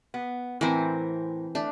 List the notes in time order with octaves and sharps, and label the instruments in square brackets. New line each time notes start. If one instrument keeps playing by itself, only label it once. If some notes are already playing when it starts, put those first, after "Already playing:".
[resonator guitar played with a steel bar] B3
[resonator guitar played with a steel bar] A2 A#4 C5 [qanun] E3 C4
[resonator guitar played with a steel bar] A3 [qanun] D4